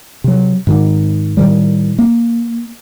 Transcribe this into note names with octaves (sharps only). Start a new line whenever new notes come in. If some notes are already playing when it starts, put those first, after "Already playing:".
C3 F#3
G#2 D#3
A2 D#3 G3
A#3